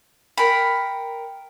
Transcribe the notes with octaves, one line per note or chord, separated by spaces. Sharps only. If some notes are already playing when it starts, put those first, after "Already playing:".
A#4 G5 B5